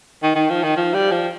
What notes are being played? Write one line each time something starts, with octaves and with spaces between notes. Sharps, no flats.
D#3
D#3
F3
D#3
F3
G3
F3